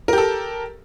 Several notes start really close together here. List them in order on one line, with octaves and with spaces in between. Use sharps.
A#4 G4 A4